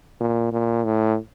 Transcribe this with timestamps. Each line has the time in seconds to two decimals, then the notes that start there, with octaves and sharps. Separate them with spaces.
0.20 A#2
0.52 A#2
0.84 A2